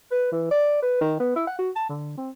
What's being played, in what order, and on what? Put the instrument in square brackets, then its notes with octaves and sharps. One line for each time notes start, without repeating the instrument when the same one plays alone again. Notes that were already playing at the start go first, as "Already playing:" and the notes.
[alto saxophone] B4
E3
D5
B4
D#3
B3
E4
F#5
F#4
A5
D3
C4